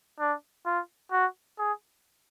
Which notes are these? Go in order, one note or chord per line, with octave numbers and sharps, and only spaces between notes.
D4
F4
F#4
G#4